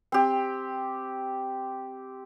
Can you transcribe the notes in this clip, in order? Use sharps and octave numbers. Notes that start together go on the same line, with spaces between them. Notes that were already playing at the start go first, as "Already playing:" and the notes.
C4 G4